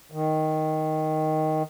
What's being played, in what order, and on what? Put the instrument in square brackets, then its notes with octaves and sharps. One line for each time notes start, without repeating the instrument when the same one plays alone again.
[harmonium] D#3